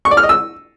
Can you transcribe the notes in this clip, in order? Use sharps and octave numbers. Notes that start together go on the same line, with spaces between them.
C#6
D5
F6
D#5
E6